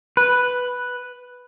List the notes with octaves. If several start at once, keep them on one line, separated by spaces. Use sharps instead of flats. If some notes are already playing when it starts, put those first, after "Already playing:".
B4